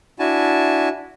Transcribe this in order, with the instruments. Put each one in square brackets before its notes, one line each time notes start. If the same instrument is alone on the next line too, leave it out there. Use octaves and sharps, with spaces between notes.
[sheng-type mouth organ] D4 E4 F#4 G#5 A5